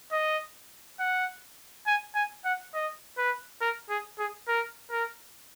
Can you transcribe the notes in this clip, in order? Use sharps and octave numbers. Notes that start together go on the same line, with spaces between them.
D#5
F#5
G#5
G#5
F#5
D#5
B4
A#4
G#4
G#4
A#4
A#4